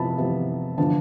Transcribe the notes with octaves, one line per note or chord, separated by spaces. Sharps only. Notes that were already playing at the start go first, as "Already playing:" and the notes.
Already playing: C3 F3 B3 A5 B5
C3 F3 B3
D3 F3 B3 D4 A5